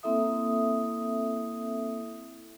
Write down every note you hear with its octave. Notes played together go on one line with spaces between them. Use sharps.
A#3 C4 E4 A4 E5 D#6